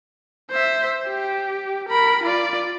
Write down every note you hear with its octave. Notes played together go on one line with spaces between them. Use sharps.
C5 E5
G4
A#4 B5
F4 D5